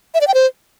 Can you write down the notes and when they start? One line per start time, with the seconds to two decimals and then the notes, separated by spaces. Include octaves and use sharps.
0.14 E5
0.21 D5
0.28 G5
0.34 C5